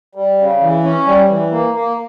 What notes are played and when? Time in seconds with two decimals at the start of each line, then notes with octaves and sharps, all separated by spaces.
0.15 G3
0.39 C#3
0.61 E3
0.84 C#4
1.07 G3
1.29 E3
1.51 A#3
1.74 A#3